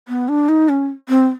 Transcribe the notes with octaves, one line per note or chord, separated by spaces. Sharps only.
B3
D4
D#4
C#4
C4